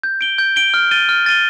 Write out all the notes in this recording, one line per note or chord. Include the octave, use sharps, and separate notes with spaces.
G6
D7 G7
G6
D7 G7
F6
A6 D#7 G7
F6
A6 D#7 G7